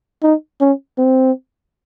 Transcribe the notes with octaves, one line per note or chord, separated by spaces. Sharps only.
D#4
C#4
C4